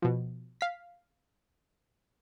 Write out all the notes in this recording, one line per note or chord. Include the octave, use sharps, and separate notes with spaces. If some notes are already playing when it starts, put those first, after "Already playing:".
B2 F3
F5 B6